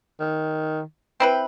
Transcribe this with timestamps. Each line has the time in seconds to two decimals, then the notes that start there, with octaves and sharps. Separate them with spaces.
0.20 D#3
1.20 C4 E4 B4 G5